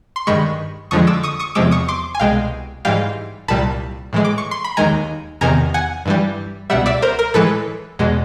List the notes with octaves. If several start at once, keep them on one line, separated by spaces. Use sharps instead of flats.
C6
G2 D#3 G#3 B5 C#6
F2 D3 F3 G#3 C#6 D#6
D6 E6
C#6 D#6
C#6 D#6
E2 C3 F3 G#3 D6 E6
C#6 D#6
C6 D6
G#5
C2 B2 G#3 F5 G5
G#2 E3 G3 F5 G5
C2 A#2 G3 A5 B5
A2 E3 G#3
D6
C#6
C6
B5
D#2 D#3 G#3 G#5 A#5
E2 C3 D#3 G#5 A#5
F#5 G#5
G2 E3 G3
C#2 B2 G3 E5 F#5
D5 E5
A#4 C5
A#4
A2 E3 G#3 A4 B4
E2 B2 G#3